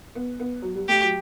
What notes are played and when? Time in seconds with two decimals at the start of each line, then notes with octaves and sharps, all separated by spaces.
0.15 B3
0.40 B3
0.62 F#3
0.76 G3
0.88 A3 G4
1.02 F#3